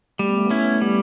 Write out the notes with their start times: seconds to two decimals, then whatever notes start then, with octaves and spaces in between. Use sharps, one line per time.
0.19 G3 A3
0.29 B3
0.38 A3
0.46 B3
0.50 A3 C#4 E4
0.64 B3
0.73 A3
0.81 G3 B3